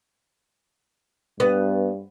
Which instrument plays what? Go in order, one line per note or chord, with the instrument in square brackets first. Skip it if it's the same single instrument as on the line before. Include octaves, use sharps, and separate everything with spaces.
[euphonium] G2 [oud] B3